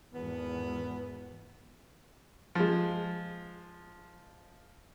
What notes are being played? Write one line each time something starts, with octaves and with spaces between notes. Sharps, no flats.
G#1 E2 B3
F3 G#3